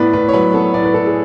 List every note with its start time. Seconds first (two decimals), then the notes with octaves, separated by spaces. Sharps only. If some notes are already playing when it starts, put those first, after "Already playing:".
Already playing: A2 B3 B4 D5
0.13 A2 B4
0.29 C#5
0.33 F#3 B4
0.54 B3 A4
0.74 A2 D5
0.84 B4
0.94 A2 A4
1.07 G#4